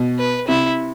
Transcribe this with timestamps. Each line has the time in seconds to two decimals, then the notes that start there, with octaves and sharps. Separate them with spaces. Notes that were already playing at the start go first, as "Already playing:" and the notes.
Already playing: B2
0.19 B4
0.48 C3 E4